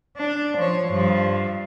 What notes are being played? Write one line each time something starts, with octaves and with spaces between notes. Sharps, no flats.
D4
F3 C#5
G2 F3